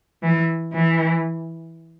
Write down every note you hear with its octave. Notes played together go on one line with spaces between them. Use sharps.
E3
E3